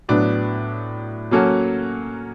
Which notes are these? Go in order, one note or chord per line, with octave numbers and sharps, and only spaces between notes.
A2 F#3 B3 D4
F#3 A#3 C#4 F#4 A4